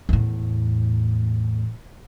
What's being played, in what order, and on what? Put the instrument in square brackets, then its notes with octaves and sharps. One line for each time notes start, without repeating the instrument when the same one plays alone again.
[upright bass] E2 A2